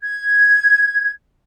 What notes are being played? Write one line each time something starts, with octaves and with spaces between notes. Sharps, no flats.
G#6